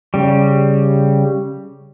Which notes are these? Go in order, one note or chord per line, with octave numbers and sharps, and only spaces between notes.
C#3 G3